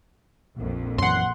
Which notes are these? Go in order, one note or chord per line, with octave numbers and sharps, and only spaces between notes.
A#1 F2
F#2 E3 F#5 C6